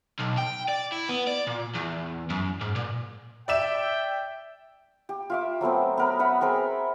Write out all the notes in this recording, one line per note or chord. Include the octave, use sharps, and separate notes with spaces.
B1
G5
D5
E4
B3
D5
A#2
E2
F#2
G#2
A#2
D5 E5 G5 E7
G4
F4 E5 D6
F#3 A3 B3 C4
B3 A#4 B5
B4 E5 F#5 B5
C4 G#4 A#4 B5